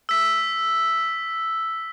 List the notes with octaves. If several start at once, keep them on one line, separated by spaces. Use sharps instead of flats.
E6 B6